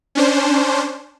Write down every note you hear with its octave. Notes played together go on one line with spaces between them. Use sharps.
C#4 D4 C5